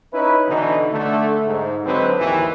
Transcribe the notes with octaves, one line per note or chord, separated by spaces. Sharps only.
C#4 D#4 E4 B4
B2 D3 E3 D#4
D3 A3
G#2
D3 F#3 G#3 C4 B4
G#1 D#2 E3